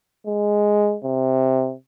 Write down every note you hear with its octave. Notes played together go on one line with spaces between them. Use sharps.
G#3
C3